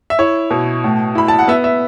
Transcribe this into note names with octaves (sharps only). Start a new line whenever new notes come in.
E5
E4 C#5
B2
A2
E4 B5
A5
F#5
B3 E5
E5